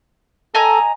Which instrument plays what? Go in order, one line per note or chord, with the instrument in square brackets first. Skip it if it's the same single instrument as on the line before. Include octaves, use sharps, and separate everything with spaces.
[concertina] A4 [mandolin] D#5 G#5 A#5